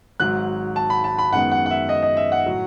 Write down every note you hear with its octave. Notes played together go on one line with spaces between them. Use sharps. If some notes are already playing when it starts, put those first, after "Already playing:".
G#1 G#2 F#3 F#6
A5
B5
A5
B5
F#2 D#3 G#3 B3 F#5
F#5
F#5
E5
D#5
D#5
E5
F#5
A2 F#3